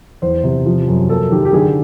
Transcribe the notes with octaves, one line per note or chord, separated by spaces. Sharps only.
E2 C5
C3
F3
F#2
A#3 A4
D#3 G4
G4
D3 G#4